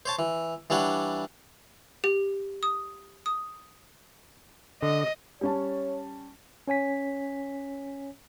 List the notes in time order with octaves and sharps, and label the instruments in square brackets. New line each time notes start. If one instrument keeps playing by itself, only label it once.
[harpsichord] C5 C#5 A5
E3
E3 G3 D4 C#5 F#5
[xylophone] G4
D#6
D#6
[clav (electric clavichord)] D3 [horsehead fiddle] D#5
[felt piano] G3 C#4 A5 [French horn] C#5
[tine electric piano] C#4 C#5 G#5 B6